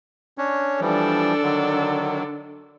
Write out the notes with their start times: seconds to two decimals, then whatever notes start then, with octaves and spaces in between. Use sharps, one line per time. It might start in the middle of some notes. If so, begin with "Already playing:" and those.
0.38 C#4 D4 C#5
0.81 E3 F3 G3 D4 A4
1.43 D3 D#3 F#3